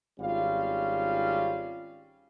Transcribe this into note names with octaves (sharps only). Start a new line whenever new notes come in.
G#1 G3 C#4 F4 F5